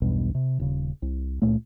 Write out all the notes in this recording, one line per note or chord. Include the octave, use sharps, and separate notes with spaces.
B1 E2 G2 B2
C3
D#1 C#3
C2
C#2 A#2 A3